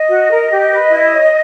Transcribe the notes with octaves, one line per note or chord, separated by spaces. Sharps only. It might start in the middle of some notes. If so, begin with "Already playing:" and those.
Already playing: D#5
F#4
A#4
G4
B4
E4
C#5